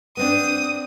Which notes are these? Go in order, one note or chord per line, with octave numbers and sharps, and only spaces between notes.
B3 C4 D4 D#6